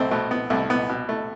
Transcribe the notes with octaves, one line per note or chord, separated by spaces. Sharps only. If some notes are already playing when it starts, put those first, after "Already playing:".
Already playing: C2 A3 C4
B2 A3
B3
C2 A3
B3
B2
A3